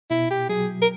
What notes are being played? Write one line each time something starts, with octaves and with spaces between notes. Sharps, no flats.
B2 E4
G4
F#3 G#4
A#4